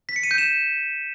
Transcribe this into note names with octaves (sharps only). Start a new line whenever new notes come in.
B6
C#7
D#7
G6
E7